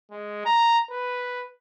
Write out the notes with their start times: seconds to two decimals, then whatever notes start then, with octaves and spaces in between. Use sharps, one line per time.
0.11 G#3
0.45 A#5
0.91 B4